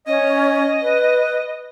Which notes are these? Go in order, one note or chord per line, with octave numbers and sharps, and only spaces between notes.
C#4 D#5
B4